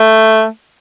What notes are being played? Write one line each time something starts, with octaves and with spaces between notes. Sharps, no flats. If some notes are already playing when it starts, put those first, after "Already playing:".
Already playing: A3